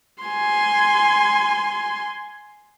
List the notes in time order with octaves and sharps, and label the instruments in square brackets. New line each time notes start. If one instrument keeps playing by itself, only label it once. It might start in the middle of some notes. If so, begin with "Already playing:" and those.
[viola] G#5 C6